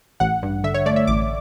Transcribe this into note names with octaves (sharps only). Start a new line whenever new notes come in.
A1 F#5
G2
D3 E5
C#5
A3 D5
E5
A1 D6